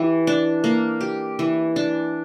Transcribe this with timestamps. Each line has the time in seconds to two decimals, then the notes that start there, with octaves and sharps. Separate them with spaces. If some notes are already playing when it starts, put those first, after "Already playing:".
Already playing: E3 G4
0.27 D4
0.64 A#3
1.01 G4
1.39 E3
1.76 D4